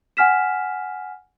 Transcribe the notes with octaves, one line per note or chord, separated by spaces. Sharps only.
F#5 G#5 F6 B6 E7